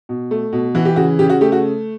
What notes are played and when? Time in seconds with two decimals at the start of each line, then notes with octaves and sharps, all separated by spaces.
0.09 B2
0.31 A3
0.53 B2
0.75 E3 F#4
0.85 G4
0.96 C#3 F#4
1.19 C#3 G4
1.30 F#4
1.41 A3 G4
1.52 F#4